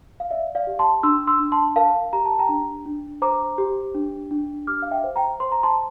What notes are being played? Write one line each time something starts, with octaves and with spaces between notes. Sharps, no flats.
F5
D5 E5
D5 F5
G4
A5 C6
D4 C6 E6
C6 E6
D4
A5 C6
A#4 F5 A5
G4 A#5
A5
G5 A#5
D4
D4
C5 A#5 D6
G4
D4
D4
G4 D6 F6
F5
E5 G5
C5
G5 A#5
C5 C6
A#5
A5 C6